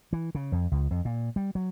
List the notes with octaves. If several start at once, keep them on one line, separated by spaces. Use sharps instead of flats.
E3
C#3
F2
C#2
F2
A#2
G3
F#3